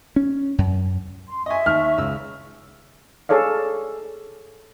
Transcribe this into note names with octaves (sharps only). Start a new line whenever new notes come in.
C#4
F#2
C6
D#5 E5 G#5 C#6
D#2 F6
C#2 E6
G#4 A4 C#5 D5 F5